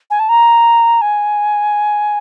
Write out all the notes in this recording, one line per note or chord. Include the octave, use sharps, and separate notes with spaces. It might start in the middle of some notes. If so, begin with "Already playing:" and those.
G#5
A5
A#5
G#5